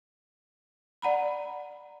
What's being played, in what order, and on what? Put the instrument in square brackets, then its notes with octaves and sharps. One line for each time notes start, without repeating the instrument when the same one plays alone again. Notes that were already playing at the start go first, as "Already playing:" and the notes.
[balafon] D5 F#5 A#5 B5